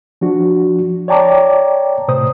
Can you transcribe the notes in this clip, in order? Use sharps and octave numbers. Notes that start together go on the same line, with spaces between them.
F3 D4 F#4
C#5 D5 G5 A5 A#5 D6
A2 C3 C5 D#6